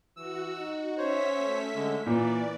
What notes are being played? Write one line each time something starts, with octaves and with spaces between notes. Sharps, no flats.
E3 F#4 E6
D#4
C#4 C5 C#5 E5 B6
A3
D3 G#3
A#2 E3 A#3 D5